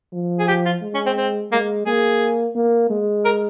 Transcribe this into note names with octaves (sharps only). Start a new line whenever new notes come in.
F3
G#4
G4
F4
G#3
C#4
C4
C4
G#3 A#3
A#3 G#4
A#3
G#3
A#4